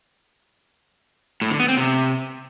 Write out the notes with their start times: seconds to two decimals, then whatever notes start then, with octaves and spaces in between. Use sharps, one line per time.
1.42 A2
1.50 D3
1.59 B3
1.68 C4
1.77 C3